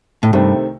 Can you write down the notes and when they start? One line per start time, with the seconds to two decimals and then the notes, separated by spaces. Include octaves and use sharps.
0.23 A2
0.33 C2 G2 C3 D#3 A3 C4